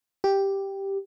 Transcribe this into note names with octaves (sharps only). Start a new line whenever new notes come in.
G4